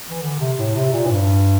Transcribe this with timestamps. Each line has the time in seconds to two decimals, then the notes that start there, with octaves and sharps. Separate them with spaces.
0.10 E3
0.22 D3
0.39 C3
0.58 A2
0.76 C3
0.93 A#2
1.07 A2
1.11 G2